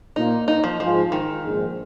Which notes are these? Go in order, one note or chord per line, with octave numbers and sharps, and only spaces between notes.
A#2 A#3 D#4 F4
D#4
F3
G#2 F3 G#3 F4
D#3
A#1 G#2 G#3